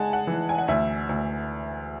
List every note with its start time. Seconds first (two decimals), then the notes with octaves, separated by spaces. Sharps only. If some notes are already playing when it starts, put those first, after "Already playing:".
Already playing: G#3 F#5 G#5 A5
0.13 F#5
0.27 E3
0.49 G#5
0.58 F#5
0.68 D2 E5
1.09 D2